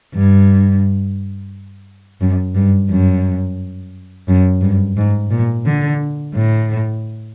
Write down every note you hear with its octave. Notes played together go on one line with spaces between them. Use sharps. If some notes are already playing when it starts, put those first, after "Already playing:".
G2
F#2
G2
F#2
F#2
G2
G#2
A#2
D3
A2